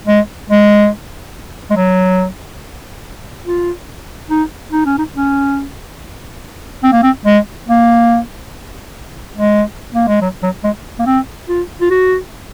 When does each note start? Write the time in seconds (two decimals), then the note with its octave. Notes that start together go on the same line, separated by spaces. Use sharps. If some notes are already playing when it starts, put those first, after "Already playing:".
0.07 G#3
0.50 G#3
1.71 G#3
1.76 F#3
3.46 F4
4.30 D#4
4.72 D#4
4.85 C#4
4.98 D#4
5.15 C#4
6.83 C4
6.93 A#3
7.03 C4
7.26 G#3
7.68 A#3
9.37 G#3
9.94 A#3
10.08 G#3
10.21 F#3
10.43 F#3
10.64 G#3
10.99 A#3
11.06 C4
11.49 F4
11.81 F4
11.90 F#4